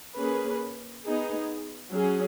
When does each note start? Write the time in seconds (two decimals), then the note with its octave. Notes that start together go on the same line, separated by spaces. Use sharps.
0.18 A#3 C#4 G#4 B4
1.06 B3 D#4 G#4
1.93 F#3 C#4 G#4